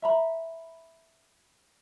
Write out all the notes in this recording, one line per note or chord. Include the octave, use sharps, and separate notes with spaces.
E5 A#5 B5